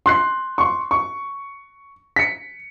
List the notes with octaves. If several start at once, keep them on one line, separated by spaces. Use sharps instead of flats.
C6 F#6 C7
C6 C#6
C#6
B6 C#7